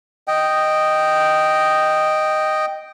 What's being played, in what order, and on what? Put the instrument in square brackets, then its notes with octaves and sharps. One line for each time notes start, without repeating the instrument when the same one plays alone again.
[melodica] D#5 G5